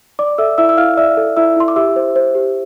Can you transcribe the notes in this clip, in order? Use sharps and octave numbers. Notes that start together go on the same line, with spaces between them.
D5 D6
A4 E5 E6
E4 E5 E6
E6
E4 F5 F6
D5 E5 E6
A4
E4 E5 E6
E4 C6
D6
G4 E5 E6
C5
C5
G4